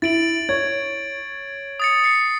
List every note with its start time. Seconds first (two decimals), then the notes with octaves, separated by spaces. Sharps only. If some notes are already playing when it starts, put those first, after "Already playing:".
0.02 E4 A6 D7 F#7
0.49 C#5 G#6
1.80 D#6 A6 C#7
2.04 C7 C#7